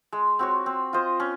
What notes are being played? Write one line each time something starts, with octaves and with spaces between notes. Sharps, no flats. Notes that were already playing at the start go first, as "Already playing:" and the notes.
G#3
C4 F#4 C#5
C4
F4 C5 D#5
C#4